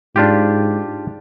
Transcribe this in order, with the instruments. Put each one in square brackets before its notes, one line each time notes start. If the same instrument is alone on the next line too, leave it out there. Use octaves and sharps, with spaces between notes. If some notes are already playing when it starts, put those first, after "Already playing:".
[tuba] G#2 [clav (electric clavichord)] D4 F4 G4